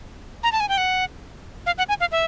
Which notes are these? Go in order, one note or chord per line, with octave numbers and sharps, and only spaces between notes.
A#5
A5
G#5
G5
F#5
F5
F#5
G#5
F5
E5